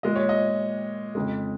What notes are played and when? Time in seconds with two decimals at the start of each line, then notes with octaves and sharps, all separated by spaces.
0.03 A#2 G#3 D#5
0.16 C#5
0.29 D#5
1.15 F2 C#3 G#3